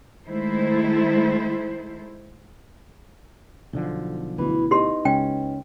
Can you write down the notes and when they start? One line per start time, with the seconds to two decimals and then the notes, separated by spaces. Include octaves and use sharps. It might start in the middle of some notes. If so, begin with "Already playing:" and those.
0.25 D#3 G#3 A3 E4 C5
3.73 B1 D3 F3
4.38 D2 B2 E3
4.71 B3 D#4 G4 C6
5.05 C#2 C#4 G5